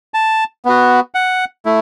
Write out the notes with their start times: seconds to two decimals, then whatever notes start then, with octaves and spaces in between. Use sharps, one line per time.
0.14 A5
0.65 B3 F#4
1.15 F#5
1.65 A3 E4